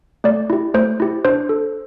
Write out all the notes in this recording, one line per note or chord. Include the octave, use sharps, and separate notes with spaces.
A3 D5
E4 G4
A3 C5
E4 G4
D4 C5
A4